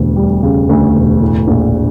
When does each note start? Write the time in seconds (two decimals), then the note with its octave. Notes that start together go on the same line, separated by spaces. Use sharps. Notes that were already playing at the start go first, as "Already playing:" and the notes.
Already playing: E1 D2
0.16 G3
0.43 C#3
0.69 D2
0.95 E1
1.21 A2
1.47 A#1